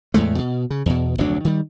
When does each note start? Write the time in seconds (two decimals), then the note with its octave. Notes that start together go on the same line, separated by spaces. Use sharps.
0.14 E2 A2 G#3 A3
0.38 B2
0.70 C#3
0.86 E2 B2
1.18 F1 D2 F#3 D4
1.45 D#3 G3